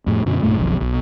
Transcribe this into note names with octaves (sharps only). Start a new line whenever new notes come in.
F2 A2
F#2 B2 D3
B1 G2 A#2 A3
F1 B1 F2 D#3
B1 B2